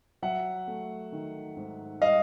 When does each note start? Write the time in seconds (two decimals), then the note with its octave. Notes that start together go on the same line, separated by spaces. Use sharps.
0.22 F#3 E5 F#5
0.67 A3
1.12 D#3
1.57 G#2
2.01 G3 D#5 F5